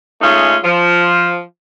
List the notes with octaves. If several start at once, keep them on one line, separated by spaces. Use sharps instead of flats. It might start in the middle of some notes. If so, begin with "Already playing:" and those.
G#3 A3 C#4 D#4 F4
F3